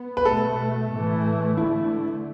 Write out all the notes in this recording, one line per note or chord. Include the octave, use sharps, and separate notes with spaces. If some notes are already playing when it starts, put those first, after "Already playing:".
Already playing: B3
B4
B2 A3 A4
A2 E3 A3
D3 A3 E4